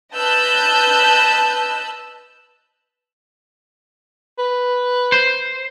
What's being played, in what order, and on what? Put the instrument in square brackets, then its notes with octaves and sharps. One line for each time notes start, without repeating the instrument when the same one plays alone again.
[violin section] B4 D#5 A5 E6 F#6 G6
[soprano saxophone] B4
[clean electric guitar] C5